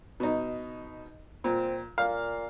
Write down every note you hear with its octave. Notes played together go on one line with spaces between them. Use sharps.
B2 D#4
A#2 C4
A#2 F5